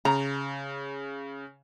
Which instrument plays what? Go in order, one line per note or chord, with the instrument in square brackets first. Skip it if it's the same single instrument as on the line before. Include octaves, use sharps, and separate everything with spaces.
[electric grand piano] C#3 [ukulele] A#5